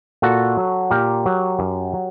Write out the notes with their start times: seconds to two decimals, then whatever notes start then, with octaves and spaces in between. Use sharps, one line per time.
0.22 A#2 F#4 A4
0.57 F#3
0.91 A#2 G4 A#4
1.26 F#3
1.59 F#2
1.94 F#3